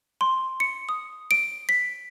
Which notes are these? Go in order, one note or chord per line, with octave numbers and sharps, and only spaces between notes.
C6
C#7
D#6
D7
B6